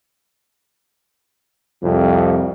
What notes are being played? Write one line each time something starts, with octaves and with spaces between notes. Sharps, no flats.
C2 F2